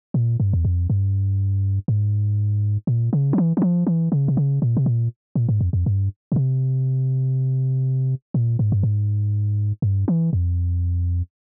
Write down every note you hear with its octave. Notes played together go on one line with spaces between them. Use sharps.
A#2
G2
E2
F2
G2
G#2
A#2
C#3
F3
E3
E3
F3
E3
C#3
C3
C#3
A#2
C3
A#2
A#2
G#2
F2
F2
G2
A#2
C3
A#2
G#2
G2
G#2
G2
E3
F2